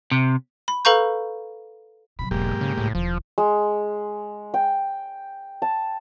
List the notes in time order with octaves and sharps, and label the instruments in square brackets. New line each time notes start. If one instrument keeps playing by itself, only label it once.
[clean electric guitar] C3
[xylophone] B5
A4 B4 F5 A#5 C#6 G6
[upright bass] B2 F#3 [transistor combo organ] B5
[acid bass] E1 [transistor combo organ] G#2 A#3 G4
[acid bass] C#3
[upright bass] C#2 [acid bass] A2
[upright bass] E1 D#3 [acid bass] F3
[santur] G#3
G5
A5